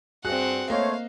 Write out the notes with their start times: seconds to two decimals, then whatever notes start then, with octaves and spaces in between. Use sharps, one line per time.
0.25 G2 C4 F#4 G#4 F#5 F#6
0.70 A3 A#3 C5 C#5 D#5 F5